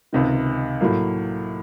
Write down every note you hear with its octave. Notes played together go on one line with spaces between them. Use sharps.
C#2 C3 D#3
A2 F#3 A#3